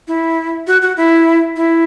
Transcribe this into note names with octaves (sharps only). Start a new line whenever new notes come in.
E4
F#4
F#4
E4
E4